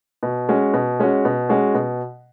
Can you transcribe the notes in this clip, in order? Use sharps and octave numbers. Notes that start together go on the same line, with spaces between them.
B2
G#3 C#4 F#4
B2
G#3 C#4 F#4
B2
G#3 C#4 F#4
B2